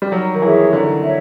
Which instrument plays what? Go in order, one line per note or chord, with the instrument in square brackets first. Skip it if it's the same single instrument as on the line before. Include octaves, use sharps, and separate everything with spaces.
[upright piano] G3
[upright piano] F#3 [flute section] D#4
[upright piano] D#3
[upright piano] E3 [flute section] G#4 C#5 E5
[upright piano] D3 [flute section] D#4
[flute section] C#5 E5